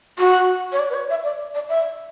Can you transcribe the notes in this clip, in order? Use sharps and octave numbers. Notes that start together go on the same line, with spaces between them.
F#4
C#5
D5
B4
C#5
E5
D5
D5
E5